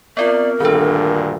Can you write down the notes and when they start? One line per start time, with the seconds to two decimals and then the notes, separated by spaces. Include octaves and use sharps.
0.17 B3 C4 F4 A#4 D5
0.60 D2 G2 A#2 D#3 D4 A4